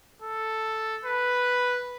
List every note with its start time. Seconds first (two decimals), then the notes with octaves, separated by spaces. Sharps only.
0.22 A4
1.05 B4